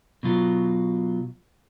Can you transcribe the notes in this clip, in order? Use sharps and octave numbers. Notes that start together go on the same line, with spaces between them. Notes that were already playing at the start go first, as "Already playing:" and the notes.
B2 F#3 F4